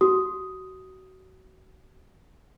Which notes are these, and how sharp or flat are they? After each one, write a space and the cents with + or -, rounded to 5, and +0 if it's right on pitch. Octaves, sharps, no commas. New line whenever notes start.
F#4 +25 D#6 +5